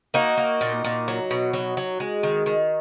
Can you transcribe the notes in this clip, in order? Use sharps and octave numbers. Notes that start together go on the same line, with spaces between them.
A#3 D#4 F#4
A#3
A#2
A#2
F#3
B2
F#3
F#3
G#3
D#3
D#3